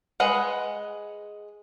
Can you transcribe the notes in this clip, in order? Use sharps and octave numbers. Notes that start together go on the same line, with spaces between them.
G#3 G#4 B4 D#5 F#5